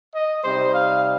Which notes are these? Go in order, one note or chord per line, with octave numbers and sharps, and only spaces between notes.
D#5
C3 G3 D#4 C5
F5